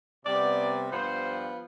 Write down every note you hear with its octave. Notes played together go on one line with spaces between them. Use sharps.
C3 G3 B3 D5
G2 F3 B3 C5